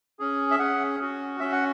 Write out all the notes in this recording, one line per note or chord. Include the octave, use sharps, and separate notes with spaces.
C#4 G#4
E5
C#4 G#4 F#5
C#4 F#4
C#4 F#4 E5
F#5